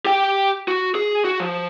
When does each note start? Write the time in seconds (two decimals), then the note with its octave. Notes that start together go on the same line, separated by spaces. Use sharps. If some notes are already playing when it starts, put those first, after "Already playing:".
0.05 G4 G5
0.68 F#4
0.95 G#4
1.25 F#4
1.40 F3